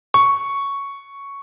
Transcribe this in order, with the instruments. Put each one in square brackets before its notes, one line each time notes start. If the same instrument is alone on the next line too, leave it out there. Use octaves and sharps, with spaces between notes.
[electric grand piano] C#6